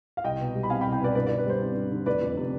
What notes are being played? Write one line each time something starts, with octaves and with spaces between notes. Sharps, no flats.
F5
C2 D#5 G5
B2
G3
B5
C4 F5 G#5
G5 B5
C2
G5 B5
B2 B4 D5
G2 B4 D5
D3 B4 D5
B4
G3 C5
C4
G2
D3
F1 B4 D5
F2
C3